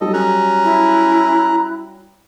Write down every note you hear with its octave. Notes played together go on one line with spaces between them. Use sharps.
F#3 G3 A4 D#5
C#4 A#5 F#6
E4